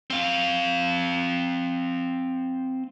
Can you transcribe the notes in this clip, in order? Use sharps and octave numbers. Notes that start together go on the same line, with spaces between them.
C4 F5